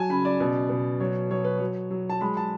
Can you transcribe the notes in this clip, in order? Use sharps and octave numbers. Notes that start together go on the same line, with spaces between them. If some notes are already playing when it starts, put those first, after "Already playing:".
Already playing: F#3 G#5 A5
C#3 B5
D5
B2
B2
F#3 C#5
F#3 C#5
B4
F#3 C#5
F#3
A5
G#3 B5
A5